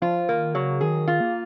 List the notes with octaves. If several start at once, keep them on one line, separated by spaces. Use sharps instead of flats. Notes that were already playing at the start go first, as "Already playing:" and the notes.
F3 F4
D#3 A#3
C#3 F#3
D#3 G#4
F4
A#3